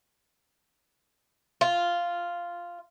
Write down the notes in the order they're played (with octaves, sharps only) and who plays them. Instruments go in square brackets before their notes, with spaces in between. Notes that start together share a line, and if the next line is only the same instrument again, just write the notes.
[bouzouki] F4